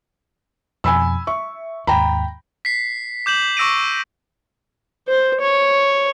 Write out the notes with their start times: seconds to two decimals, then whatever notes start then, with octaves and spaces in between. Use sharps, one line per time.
0.84 F2 B2 G#5 B5 E6
1.27 E5 C#6
1.87 D#2 G#2 G5 A#5 B5
2.65 B6 C7
3.26 D6 G6 E7 F#7
3.57 C#6 D6 E6 A#6 D7 D#7
5.08 C5
5.40 C#5